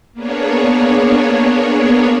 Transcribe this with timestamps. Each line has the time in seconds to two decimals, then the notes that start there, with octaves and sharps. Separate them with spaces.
0.13 A#3 B3 D4 G#4 C#5